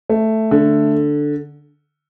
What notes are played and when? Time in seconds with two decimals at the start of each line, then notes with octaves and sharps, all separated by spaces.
0.10 A3
0.51 D3